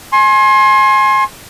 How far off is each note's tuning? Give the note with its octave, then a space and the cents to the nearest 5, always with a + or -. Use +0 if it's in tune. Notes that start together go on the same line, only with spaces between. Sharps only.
G#5 +15 C6 +35